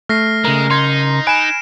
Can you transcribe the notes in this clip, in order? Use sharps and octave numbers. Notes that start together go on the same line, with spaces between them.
A3 F6 A#6 C7
C#3 G#3 A#4
D#4 C6 G#6
G#5 B5 F#6 D7 E7